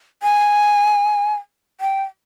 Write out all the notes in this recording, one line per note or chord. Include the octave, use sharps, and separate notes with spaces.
G#5
G5